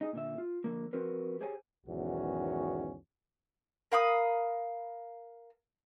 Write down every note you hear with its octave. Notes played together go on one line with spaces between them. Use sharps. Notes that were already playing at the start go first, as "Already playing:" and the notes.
D#4 G#4
A#2 D3 E5
F4
D3 F3 A#3
F3 C4 F#4 A#4 B4
G4 G#4 C5 C#5 G5 G#5
B1 E2 G#2 D#3 C#4 F#4
A#4 F5 B5 D#6